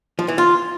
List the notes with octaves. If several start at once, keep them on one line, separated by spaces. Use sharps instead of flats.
F3
E3
F4